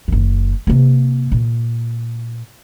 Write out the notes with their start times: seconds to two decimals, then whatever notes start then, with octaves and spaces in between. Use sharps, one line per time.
0.08 F#1 D#3
0.67 C3 A#3
1.32 A#2